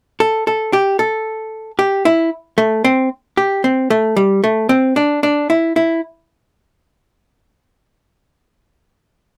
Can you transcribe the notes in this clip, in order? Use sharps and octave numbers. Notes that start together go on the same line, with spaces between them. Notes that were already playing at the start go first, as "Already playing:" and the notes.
A4
A4
G4
A4
G4
E4
A3
C4
G4
C4
A3
G3
A3
C4
D4
D4
E4
E4